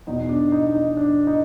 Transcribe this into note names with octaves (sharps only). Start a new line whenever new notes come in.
E2 B2 D#4
D4
D#4
D#4
D4
D#4